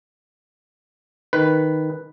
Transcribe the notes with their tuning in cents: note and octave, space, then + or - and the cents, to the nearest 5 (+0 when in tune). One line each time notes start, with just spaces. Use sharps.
D#3 +0 B4 +0